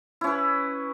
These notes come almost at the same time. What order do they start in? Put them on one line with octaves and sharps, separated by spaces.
E4 C#4 B4